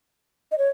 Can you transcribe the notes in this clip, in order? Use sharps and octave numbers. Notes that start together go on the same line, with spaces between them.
D#5
C#5